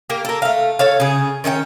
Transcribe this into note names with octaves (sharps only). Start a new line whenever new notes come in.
A#3 G4
A4 A#4
A3 F5
A4 C#5 F5
C#3 G#4
D#3 C#4 D#5 G5